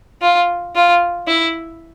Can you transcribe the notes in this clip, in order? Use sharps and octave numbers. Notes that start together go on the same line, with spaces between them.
F4
F4
E4